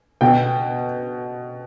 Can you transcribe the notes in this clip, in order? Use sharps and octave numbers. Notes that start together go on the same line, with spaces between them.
B2 G5